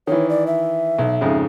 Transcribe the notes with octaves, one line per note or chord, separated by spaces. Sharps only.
D#3 E3 C#5
D5
E5
B1
F2 G#2 C#3